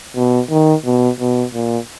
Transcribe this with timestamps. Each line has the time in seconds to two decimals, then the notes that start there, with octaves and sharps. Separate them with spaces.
0.16 B2
0.50 D#3
0.85 B2
1.20 B2
1.54 A#2